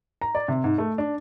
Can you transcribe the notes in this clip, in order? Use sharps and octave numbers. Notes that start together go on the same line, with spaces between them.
A#5
D5
C3
G#2
A3
D4